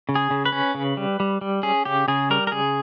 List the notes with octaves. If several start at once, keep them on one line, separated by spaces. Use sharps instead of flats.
C#3
G#4
C#3
B4
C#4
C#3
G3
G3
G3
C#4 G#4
C#3 G4
C#3 G#4
G3 A#4
A#4
C#3 G#4